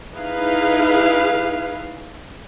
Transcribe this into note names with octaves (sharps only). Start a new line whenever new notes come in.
D#4 E4 G#4 B4 F5